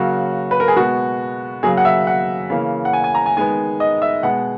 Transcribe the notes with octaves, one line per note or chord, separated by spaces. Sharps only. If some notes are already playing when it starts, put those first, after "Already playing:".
Already playing: C#3 F#3 A#3 F#4
B4
A#4
G#4
B2 G#3 B3 F#4
C#3 F#3 A#3 G#4
F#5
E5
F#5
C#3 E3 A#3
F#5
G#5
G#5
A#5
G#5
D#3 G#3 B3 G#5
D#5
E5
B2 G#3 B3 F#5